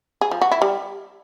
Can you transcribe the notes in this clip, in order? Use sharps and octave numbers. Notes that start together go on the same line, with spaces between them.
G#4
F3
F#4
E4
G3